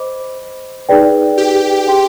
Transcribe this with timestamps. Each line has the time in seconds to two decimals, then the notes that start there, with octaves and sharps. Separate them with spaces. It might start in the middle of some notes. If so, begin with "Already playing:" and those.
Already playing: C5 D#5 B5 D6
0.89 D#4 G#4 B4 D5 G5
1.38 G4
1.86 D4 G#4 D5 G5 C6